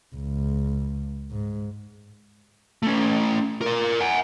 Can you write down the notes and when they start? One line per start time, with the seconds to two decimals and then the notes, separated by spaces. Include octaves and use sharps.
0.15 C#2
1.31 G#2
2.83 A3 C#4
3.61 A#4 D5
4.00 F#5 G#5